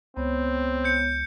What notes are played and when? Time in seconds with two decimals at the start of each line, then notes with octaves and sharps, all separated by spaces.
0.17 C#2 B3 C4 C#5
0.84 G6 C#7